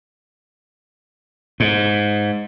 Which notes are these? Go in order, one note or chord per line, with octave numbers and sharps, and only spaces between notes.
G#2